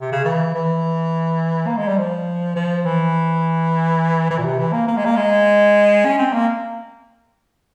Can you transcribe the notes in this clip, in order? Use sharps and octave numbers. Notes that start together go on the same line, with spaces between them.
C3
C#3
E3
E3
A#3
G#3
G3
F3
F3
E3
E3
A#2
C3
E3
A#3
A#3
G#3
A#3
G#3
C#4
C4
A#3